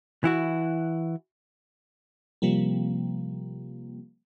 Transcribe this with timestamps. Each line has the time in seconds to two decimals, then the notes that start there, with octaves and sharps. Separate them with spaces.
0.24 E3 E4 F#4
2.42 C3 F3 G3 A#3